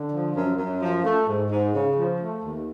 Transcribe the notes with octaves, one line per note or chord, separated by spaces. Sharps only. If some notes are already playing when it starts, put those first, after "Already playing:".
Already playing: D3
F3
F#2
F#2
F3
A3
G#2
G#2
C#3
F3
A3
D#2